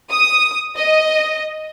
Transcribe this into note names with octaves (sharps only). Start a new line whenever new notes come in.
D#6
D#5